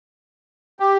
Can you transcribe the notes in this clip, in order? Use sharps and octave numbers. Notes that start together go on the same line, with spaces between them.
G4